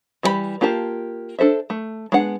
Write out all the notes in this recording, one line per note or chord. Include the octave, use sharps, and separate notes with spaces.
E3 G3 F#4 G4 B5
A#3 F4 G4 A#4 A5
D4 A4 C5 E5
A3
G#3 B3 D4 F#5